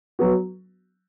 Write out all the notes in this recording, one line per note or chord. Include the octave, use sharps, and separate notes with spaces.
F#3 B3 F#4